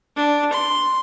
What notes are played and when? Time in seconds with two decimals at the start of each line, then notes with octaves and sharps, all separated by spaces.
0.16 D4
0.53 C6